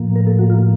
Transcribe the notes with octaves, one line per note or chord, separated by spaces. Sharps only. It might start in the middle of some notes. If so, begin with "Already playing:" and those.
Already playing: A2 F3 A#3
A#4
A4
F#4
F4